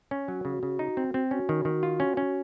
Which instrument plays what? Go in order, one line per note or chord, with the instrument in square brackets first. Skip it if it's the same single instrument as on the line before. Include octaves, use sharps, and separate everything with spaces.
[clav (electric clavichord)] C#4
[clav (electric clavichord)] F#3 [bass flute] F#4
[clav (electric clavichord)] C#3
C#3
D#4
C4
C4
[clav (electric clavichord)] C#4 [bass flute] F#4
[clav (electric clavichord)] D#3
D#3
F4
C#4
C#4